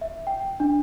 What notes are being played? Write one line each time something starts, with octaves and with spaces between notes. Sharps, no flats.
E5
G5
D4